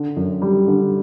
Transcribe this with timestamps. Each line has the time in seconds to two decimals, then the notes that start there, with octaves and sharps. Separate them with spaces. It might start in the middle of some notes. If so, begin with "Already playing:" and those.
Already playing: D3
0.17 F#2
0.42 G3
0.68 D3